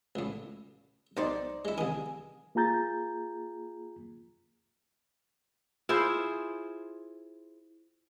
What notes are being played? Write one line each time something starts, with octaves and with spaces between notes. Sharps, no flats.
C#2 A2
B1 D#4 C5 D5
G#3 E4
C2 D#3 G#4
A#3 F4 G#4 A#5 G6 A6
E4 F4 G#4 C5